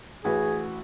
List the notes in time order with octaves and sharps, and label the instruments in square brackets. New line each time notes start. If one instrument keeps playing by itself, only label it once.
[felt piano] A1 F#4 B4 [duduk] G#4